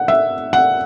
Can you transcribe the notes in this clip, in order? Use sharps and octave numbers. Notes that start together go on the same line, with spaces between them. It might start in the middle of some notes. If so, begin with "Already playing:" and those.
Already playing: F#5
E5
F#5